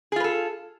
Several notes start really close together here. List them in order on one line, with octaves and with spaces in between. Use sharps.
G#4 F4 B4 A4